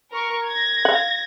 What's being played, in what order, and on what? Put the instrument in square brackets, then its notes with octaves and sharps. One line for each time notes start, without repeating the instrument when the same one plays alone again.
[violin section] A#4 C#6
G#6 A#6
[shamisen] F5 F#5